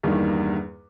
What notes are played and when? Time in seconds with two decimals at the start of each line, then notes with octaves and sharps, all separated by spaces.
0.03 E2 G2 D#3 G3 A#3